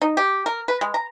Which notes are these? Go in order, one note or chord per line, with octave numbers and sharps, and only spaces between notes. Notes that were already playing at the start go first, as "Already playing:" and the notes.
D#4
G4
A#4
B4
G#3
A#5